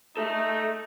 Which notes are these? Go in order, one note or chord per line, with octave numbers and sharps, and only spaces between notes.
D#4 A4 E5